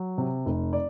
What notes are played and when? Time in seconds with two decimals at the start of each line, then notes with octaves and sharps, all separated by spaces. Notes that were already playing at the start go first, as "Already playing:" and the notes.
Already playing: F#3
0.18 C3
0.46 F1
0.73 D5